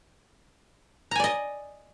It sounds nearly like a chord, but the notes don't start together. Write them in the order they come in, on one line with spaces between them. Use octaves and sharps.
A#5 G#5 D5 D#5